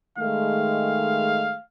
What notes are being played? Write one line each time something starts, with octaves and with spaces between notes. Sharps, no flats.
D#3 G#3 A3 F5